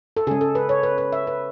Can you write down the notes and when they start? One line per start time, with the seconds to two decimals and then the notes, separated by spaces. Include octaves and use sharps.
0.17 A4
0.27 C#3 G#3 G#4
0.41 A4
0.55 B4
0.69 C#5
0.83 B4
0.98 B4
1.13 E5
1.27 B4